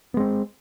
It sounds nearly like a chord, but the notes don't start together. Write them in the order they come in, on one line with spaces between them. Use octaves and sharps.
B3 G#3 C4